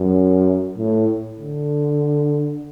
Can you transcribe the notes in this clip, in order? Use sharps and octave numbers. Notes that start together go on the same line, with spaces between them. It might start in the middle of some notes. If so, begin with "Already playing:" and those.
Already playing: F#2
A2
D3